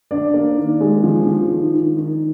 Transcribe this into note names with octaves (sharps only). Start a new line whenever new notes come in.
D4 D5
A#3
D#3
G#3
F3
F3
D#3
D#3
D#3